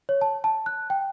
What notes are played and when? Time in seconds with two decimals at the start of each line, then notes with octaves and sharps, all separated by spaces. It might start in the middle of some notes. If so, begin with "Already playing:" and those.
0.09 C#5
0.21 A5
0.44 A5
0.66 F#6
0.90 G5